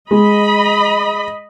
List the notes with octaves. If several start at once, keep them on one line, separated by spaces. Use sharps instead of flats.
G#3 D#5 B5